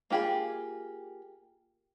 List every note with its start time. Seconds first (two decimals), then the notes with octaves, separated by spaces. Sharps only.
0.10 A#3 F4 G4 G#4 B5